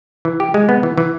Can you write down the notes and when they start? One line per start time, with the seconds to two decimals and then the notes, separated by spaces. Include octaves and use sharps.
0.25 E3
0.40 G4
0.54 G#3
0.69 B3
0.83 E3
0.98 E3